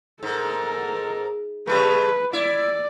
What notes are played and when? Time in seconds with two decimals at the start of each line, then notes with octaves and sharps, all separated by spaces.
0.23 G#2 A4 A#4
1.67 C#3 G3 A3 B4
2.33 E4 D5